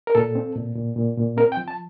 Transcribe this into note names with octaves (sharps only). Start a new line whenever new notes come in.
A#4
A#2 A4
C4
A#2
A#2
A#2
A#2
C4 A#4
G5
F3
A5